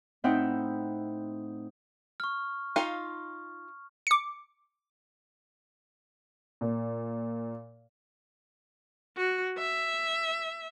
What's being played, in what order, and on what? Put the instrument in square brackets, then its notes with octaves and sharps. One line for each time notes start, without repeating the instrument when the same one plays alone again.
[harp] A2 C4 D#4 E5 F#5 G5
[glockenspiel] C#6 F6
[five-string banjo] D#4 F4 F5
[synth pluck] D6 C#7
[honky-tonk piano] A#2
[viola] F#4
E5